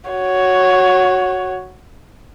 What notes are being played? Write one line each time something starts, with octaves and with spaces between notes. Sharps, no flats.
F#4 C#5